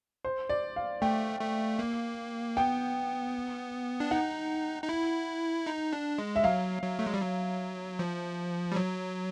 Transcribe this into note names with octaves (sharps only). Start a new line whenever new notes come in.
C5
D5
F5
A3 G5
A3
A#3
B3 G5
D4
D#4 F#5
D#4
E4
D#4
D4
G#3
E5
F#3 F5
F#3
A3
G#3
G3
F#3
F3
G3
F#3